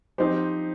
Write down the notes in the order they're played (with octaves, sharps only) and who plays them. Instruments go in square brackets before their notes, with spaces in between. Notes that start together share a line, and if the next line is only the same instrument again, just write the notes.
[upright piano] F3 C4 D#4 G4 C5